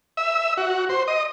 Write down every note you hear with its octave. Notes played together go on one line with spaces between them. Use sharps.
E5
F#4
C5
D#5